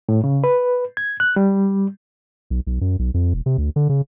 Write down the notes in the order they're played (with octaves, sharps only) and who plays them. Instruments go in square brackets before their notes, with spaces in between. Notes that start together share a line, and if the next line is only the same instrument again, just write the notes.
[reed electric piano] A2
C#3
B4
G#6
F#6
G3
[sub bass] B1
B1
F#2
B1
F2
E1
C3
D2
D3
C#3